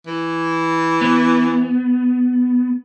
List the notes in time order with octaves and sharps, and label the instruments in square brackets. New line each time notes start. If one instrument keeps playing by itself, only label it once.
[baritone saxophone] E3
[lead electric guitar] B3